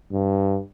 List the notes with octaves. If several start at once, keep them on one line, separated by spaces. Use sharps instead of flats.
G2